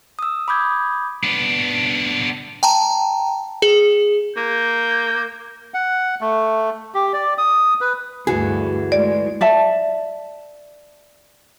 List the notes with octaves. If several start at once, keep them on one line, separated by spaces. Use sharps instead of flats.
D#6 E6
B5 D6 D#6 G6 G#6
B3 D4
G5 A5 A#5
G#4
A#3 G6
F#5
A3
G4
D5
D#6
B4
D2 G2 E3 F#4 G#4
G#3 A3 D5
D5 E5 A5